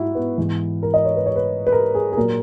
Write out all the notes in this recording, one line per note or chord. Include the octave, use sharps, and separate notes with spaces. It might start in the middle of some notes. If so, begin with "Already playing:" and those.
Already playing: G#2 E4 F#4
B3
G#2 E3
A#4
D#5
C#5
B4
C#5
B4
B4
A#4
G#4
G#4
A#2 F#3 A#4